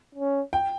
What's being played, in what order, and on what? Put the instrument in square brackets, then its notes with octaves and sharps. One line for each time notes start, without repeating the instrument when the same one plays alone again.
[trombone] C#4
[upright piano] G5